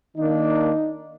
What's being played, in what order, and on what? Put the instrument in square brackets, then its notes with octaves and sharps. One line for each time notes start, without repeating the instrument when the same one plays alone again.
[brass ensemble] D#3 A#3 D4 [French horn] D#4